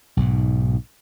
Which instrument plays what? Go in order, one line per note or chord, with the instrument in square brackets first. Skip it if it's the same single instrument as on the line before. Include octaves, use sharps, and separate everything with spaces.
[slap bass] B1 G#2 B2